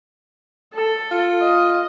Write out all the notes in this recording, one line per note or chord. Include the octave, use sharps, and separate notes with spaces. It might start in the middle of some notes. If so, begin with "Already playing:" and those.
A4
F4
D#5